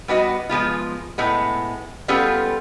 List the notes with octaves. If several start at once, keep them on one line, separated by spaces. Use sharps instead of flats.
G3 B3 F#4 D#5
F3 G#3 B3 F4
A2 G#3 B3
G3 B3 C#4 F4 G#4 A4